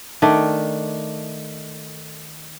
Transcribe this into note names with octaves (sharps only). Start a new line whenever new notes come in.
D#3 A3 D4 D#5